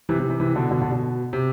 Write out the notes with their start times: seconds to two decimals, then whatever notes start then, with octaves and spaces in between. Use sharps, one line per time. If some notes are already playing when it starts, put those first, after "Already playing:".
0.09 C3 E3
0.19 C3 E3
0.30 C3 E3
0.40 C3 E3
0.56 B2 D3
0.71 B2 D3
0.81 B2 D3
0.92 B2
1.33 C3